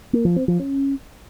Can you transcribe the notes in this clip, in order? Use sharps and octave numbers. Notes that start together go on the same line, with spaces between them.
A#3
F3
C4
F3
C#4